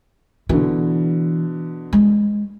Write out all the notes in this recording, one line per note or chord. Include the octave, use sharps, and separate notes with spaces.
B2 D3 E3
G#3